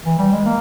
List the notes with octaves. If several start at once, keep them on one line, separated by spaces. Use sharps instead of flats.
E3
G3
G#3
A#3